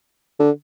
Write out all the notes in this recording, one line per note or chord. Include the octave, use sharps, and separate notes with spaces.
D3